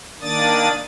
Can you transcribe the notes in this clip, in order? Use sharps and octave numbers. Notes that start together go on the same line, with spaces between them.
D#3 A#3 D4 D5 D#6 A6